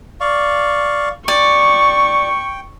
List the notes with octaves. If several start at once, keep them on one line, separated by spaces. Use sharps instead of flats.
D5 F5 C#6
D5 G5 C#6